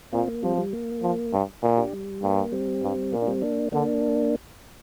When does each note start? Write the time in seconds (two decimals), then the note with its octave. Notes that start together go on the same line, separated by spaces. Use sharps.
0.13 A#2 C4 F4
0.28 A#3
0.43 F3 G3 C4
0.58 G3
0.73 A#3
1.03 F3
1.33 G2
1.63 A#2
1.77 D4 G4
1.93 G3
2.23 G2 A#3
2.52 G3 C4
2.83 G2
3.12 A#2 A#3
3.22 D4
3.27 G3 C4
3.42 A#3 D4
3.72 D3 A#3 D4